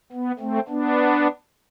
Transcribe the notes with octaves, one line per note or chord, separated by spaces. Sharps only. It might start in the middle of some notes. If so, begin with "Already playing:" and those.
B3
A3 C4
B3 D4